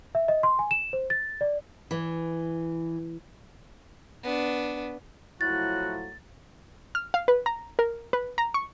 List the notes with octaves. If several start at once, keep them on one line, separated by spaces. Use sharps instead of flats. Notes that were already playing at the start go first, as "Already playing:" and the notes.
E5
D#5
C6
G#5
E7
C5
A6
D5
E3
B3 D4
A2 F3 F#3 E4 F#4 A6
F6
F5
B4
A#5
A#4
B4
A#5
C#6